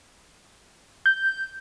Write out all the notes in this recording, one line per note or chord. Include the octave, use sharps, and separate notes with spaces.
G6